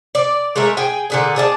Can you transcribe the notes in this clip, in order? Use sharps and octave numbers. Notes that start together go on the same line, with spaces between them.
D5
G#3 A3 A#4 E5
G#4 G5 G#5
A#2 D3 G#4
G#4 D5 E5 A5